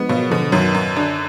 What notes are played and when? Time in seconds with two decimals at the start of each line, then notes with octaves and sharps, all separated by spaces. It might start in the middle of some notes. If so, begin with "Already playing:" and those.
Already playing: D3 F3 G#3 B3
0.09 B2 F#3 A#3
0.30 B2 D3 F3
0.52 F#2 D#3 F#3
0.74 F#2
0.96 D3